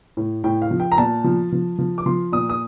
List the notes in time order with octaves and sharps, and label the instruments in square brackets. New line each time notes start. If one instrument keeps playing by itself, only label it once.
[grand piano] A2
A2 G5
F5
F3
G5
A#5
A#2 A5
F3
F3
F3
D6
F3 C6
A#2 D#6
D#6